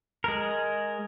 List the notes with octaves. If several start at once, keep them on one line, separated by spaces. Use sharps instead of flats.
G#3 A#4